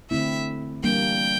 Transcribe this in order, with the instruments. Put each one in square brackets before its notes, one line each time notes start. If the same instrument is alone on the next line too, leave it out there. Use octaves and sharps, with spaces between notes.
[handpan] D3 A3 C4 E4 [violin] E5
[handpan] E3 G3 A#3 D4 [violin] G5